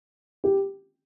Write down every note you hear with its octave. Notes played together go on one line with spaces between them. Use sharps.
G4